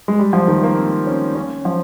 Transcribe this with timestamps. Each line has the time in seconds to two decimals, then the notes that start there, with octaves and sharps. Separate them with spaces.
0.08 G#3
0.19 G3
0.33 F3
0.48 D#3
0.63 A#3
0.77 C4
1.07 C#4
1.36 C#4
1.65 F3